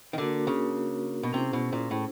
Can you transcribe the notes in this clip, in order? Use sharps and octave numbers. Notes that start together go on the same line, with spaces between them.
D#3
D3 A#3 D4 F#4 A#4
C#3
B2
C3 C#4 E4 G#4 C5
B2
A#2
A2